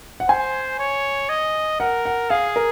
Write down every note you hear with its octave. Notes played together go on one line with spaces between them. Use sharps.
F#5
C5 G#5
C#5
D#5
A#4 F#5
F#5
G#4 F5
A#4